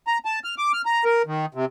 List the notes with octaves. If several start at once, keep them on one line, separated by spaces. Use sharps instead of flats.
A#5
A5
F6
D6
F6
A#5
A#4
D#3
C3